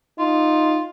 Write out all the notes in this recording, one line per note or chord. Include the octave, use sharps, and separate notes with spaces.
D#4 F4